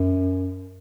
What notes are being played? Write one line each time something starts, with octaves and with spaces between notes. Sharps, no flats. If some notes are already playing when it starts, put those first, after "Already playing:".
Already playing: F#2